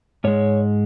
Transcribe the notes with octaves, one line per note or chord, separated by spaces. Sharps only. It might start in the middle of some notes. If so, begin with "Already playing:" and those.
G#2 G#3 C#5